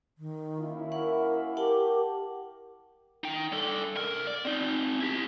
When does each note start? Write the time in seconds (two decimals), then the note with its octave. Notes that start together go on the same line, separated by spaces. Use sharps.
0.18 D#3
0.59 F#2 A#3 E4
0.92 A#4 F#5 C#6
1.57 G4 A#4 F#5 G5 A5
3.24 D#4 G5
3.52 G3 A4
3.96 C2 A#4
4.27 D5
4.45 C4 D#4
5.00 E4 G4